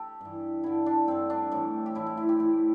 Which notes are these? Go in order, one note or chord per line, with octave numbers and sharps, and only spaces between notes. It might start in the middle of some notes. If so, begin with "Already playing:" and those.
Already playing: G4 A4
G2 E3
G2 D3 E4
D4
G2 D3 C4
D4
A2 E3
G4
A2 E3 E4
E4
E4
G4
A2 E3 E4